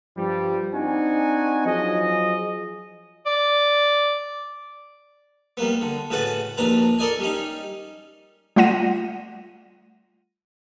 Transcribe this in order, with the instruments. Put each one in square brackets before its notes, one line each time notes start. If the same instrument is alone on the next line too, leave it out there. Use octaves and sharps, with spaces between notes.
[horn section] G2 F3 G3
C4 D4 D#4 F#4 G#5
F3 F#3 G#4 D#5
[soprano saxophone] D5
[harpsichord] G3 A#3 B3
D3
A2 C#3 F#4 B4 F#5 A5
A#1 D#2 D4 B4 A#5
A4 A#4 D5 D#5 G#5
G3 C#4 D#4
[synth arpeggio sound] G3 A3 F4 F#5 A#6 D#7